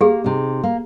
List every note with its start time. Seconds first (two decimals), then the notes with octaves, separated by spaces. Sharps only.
0.01 A#3 G4 G#4
0.24 C3 D#4
0.63 A#3